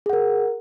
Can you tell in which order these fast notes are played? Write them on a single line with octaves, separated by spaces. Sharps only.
G#4 F#5 A#4